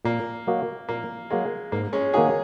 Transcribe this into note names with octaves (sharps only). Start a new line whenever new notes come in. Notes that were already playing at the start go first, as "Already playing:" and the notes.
A#2 A#3
F#3 A#3 F#4 D#5
A#2 A#3
F#3 G#3 A#3 F#4 D#5
G#2 A#3
G#3 C#4
D#3 A#3 D#4 F#4 G#4 C#5